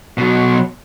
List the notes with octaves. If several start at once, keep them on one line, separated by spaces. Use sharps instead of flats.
B2 F#3